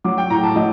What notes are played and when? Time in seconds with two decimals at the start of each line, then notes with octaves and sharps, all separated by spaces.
0.04 F#3 D6
0.18 G5
0.30 A2 A#5
0.43 A5
0.56 F#3 D#5